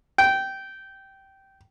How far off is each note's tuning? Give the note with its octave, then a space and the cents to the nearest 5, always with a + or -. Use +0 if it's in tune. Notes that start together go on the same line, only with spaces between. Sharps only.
G5 -15